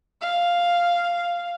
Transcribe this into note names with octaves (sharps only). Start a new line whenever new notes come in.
F5